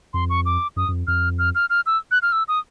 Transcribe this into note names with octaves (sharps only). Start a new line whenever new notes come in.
F2 C6
C#6
D6
F#2 D#6
F#2
F2
F2 F6
F6
F6
F6
E6
F#6
F6
E6
D#6